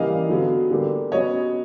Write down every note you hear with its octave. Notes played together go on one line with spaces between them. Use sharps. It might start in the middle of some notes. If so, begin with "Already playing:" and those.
Already playing: C#3 E3 G3 A#3 D#5 F5
D3 F#3 B3
D3 G3 A#3
C#3 F#3 B3 C#5 D#5